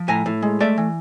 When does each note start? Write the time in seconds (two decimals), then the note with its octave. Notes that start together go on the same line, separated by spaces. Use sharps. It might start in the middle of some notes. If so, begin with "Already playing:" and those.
Already playing: F3
0.08 A2 G#5 A#5
0.26 A2
0.42 G#3
0.60 A3 D5 E5
0.77 E3